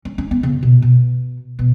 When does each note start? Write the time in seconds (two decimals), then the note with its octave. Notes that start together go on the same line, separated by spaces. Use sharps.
0.05 C#4
0.18 C#4
0.31 B3
0.43 C#3
0.63 B2
0.82 B2
1.59 B2